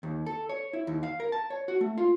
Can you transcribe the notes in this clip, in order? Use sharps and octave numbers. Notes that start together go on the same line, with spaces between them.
D#2
A4
C#5
E4
D#2
F5
A#4
A5
C#5
F#4
A3
F4